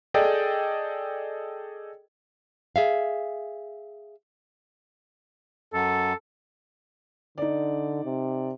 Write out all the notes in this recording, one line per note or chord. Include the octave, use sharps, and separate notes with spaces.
G#4 A4 D5 D#5 G5
G#4 E5 F5
F#2 A4
D3 D#4 D5
C3